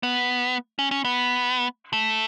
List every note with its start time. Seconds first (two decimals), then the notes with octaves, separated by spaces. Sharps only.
0.03 B3
0.79 C#4
0.91 C#4
1.05 B3
1.93 A3